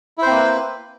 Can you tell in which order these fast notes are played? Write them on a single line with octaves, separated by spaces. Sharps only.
E4 C5 C4 A#3 B4